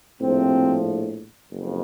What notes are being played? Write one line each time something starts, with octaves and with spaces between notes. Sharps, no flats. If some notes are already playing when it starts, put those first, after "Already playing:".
A#1 A2 C3 F3 C4
F#1 F2